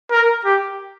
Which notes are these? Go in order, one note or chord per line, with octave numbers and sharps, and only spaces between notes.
A#4
G4